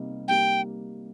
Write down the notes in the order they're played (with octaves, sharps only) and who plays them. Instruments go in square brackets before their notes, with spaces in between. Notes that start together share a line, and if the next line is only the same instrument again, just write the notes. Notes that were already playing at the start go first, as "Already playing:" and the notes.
Already playing: [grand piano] C3 G3 A#3 D#4 G4
[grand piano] G3 A#3 D#4 G4 [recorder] G5